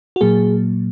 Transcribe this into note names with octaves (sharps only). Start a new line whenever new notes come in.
F#4
A#2 F#3 A#3 G#4